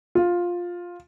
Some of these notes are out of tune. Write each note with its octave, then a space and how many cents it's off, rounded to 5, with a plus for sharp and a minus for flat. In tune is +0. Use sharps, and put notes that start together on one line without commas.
F4 +10